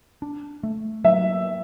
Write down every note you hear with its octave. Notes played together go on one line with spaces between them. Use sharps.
D4
A3
F#3 E5